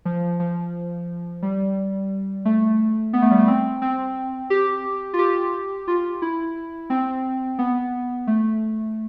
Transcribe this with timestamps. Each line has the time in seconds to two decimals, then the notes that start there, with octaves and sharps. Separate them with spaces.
0.05 F3
0.40 F3
1.42 G3
2.45 A3
3.13 B3
3.22 A3
3.31 G3
3.40 A3
3.48 C4
3.82 C4
4.50 G4
5.14 F4
5.19 G4
5.88 F4
6.22 E4
6.90 C4
7.59 B3
8.27 A3